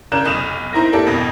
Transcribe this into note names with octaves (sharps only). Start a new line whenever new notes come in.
C#3 D4 A#4 F#6 G6 E7
F1 B1 D#6 E7 F7
C4 D#4 E4 A#4 A#6
A#3 D4 E4 G4 A4
G#1 F2 B2 A#6